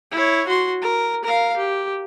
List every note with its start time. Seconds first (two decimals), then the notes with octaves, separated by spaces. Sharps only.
0.12 E4 C#5
0.47 F#4 C6
0.82 A#4
1.24 A#4 F5
1.57 G4